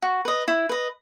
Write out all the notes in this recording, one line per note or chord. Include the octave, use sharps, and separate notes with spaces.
F#4
B4 D#5
E4
B4 D#5